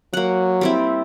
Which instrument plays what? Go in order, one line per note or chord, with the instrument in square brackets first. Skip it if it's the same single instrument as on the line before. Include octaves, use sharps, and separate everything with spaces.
[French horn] F#3 [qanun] A#3 F#5
[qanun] G3 C4 E4